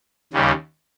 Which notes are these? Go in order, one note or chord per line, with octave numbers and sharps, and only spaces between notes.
D#2 C#3 G3